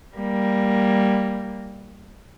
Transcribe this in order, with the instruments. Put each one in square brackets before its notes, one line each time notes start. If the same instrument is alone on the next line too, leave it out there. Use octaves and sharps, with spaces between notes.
[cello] G3 A#3